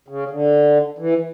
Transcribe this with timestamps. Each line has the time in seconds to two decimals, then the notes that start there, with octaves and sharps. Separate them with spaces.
0.08 C#3
0.31 D3
0.98 E3